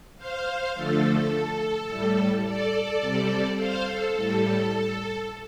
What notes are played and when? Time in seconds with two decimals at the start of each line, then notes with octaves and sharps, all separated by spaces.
0.17 C5 F5
0.74 D3 F3 A3 A4
1.87 A2 G3
2.44 A4 D5
3.00 C3 G3
3.57 C5 F5
3.85 A4
4.13 A2 G3 A4